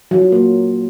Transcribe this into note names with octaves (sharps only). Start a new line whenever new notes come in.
F#3
F4
A#3